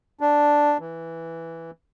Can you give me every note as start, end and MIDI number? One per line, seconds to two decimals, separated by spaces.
0.21 0.77 62
0.80 1.71 52